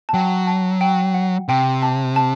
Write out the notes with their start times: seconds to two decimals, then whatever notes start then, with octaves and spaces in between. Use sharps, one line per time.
0.09 A5
0.14 F#3 G5
0.47 A5
0.81 G5
1.14 F#5
1.48 C3 G5
1.82 A5
2.16 A5